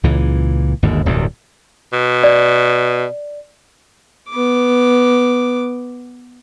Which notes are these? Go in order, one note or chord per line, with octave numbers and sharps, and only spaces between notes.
C#2 A#2 E3
G1 D#2 G#2
D1 C2 G2 C3
B2
D5
B3 D6